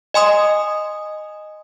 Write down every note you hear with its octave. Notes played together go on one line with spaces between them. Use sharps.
D#5 G#5 C6 D#6